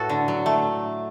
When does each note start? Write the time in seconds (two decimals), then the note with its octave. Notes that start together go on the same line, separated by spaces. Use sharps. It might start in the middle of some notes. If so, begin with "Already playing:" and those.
Already playing: A2 F#4 A4 B4
0.09 D3
0.28 F#3
0.46 A3